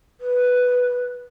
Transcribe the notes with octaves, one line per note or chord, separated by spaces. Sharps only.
B4